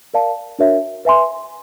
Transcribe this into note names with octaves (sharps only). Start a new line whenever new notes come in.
A#4 D5 F5 A5
D4 F#4 A#4 C#5 E5
B4 E5 G#5 C6